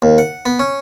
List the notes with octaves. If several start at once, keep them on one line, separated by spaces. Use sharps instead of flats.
D#2
F#5
B3
C#4